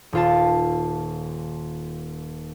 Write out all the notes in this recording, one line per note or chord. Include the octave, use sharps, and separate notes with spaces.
D#1 F4 A5